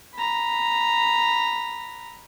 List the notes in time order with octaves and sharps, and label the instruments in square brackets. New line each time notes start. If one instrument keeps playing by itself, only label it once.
[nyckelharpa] A#5 B5